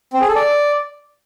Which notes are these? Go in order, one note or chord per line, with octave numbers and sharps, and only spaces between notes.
C4
G#4
A4
D5